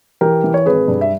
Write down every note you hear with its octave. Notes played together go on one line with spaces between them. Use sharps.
E3 G4 A#4
E3
C#5
G#1 G#4 B4
G2
E5